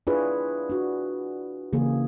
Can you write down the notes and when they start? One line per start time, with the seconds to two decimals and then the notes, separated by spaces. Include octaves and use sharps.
0.07 D4 E4 F4 G#4 B4 C#5
0.70 D4 F#4
1.73 C#3 E3 A#3 G4 G#4